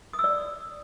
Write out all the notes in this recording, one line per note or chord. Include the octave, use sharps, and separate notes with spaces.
D#6
E6
D5